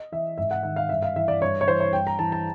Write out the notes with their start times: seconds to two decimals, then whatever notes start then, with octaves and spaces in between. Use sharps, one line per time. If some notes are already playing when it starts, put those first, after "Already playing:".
Already playing: D#5
0.12 E3 E5
0.38 G#2 E5
0.51 F#5
0.63 D#3 F#5
0.76 F5
0.89 G2 E5
1.03 F5
1.16 E3 E5
1.28 D5
1.41 G2 C#5
1.61 C#5
1.68 E3 C5
1.80 C#5
1.93 G2 G5
2.07 A#5
2.19 E3 A5
2.32 A5